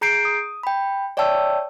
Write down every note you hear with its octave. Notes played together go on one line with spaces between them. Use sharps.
G#4 A#5 G6 C7 D7
D#6
G5 B5
C#5 D5 E5 G5 A5 E6